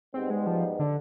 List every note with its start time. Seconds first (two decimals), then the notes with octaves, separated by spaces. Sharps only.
0.14 G#2 G3 B3 C4 D#4 G4
0.30 G#3
0.47 F3
0.79 D3